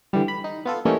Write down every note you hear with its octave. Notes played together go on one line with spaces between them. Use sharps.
D3 E3 G3
B5
D#4
B3 F4 A4
E3 G3 A3 A#3 C#4 D#4